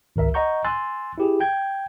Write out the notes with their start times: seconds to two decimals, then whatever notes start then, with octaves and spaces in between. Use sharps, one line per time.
0.16 G#1 C#2 A#4 E5
0.34 D#5 F#5 A#5 C#6 G6
0.64 G#5 C6 E6 F#6 A6
1.18 E4 G4 G#4
1.40 G5 G6 G#6